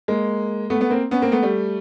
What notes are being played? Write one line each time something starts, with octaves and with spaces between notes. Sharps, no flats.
G#3 A#3
A3 B3
A3 B3
A#3 C4
B3 C#4
A#3 C4
A3 B3
G3 A3